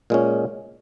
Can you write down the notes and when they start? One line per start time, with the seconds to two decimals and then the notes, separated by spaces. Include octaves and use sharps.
0.10 A#2 G#3 C#4